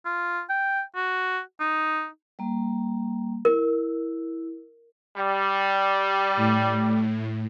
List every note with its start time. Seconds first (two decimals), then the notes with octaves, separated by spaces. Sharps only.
0.05 F4
0.49 G5
0.96 F#4
1.60 D#4
2.39 G3 A#3
3.45 E4 A#4
5.17 G3
6.36 A2